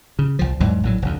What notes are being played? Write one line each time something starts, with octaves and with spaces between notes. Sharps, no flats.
C#3
C2 F3
E2 G#2 E3 F#3
A#1 A2 F#3
F1 D2